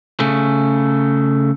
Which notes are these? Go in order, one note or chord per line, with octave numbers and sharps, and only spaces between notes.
C#3 A3